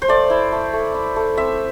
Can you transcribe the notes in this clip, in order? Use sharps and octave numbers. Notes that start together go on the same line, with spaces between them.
C5
A3 D5
E4
A3
A3
E4
A3
C4 E5